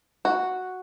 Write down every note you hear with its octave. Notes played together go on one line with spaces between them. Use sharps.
F#4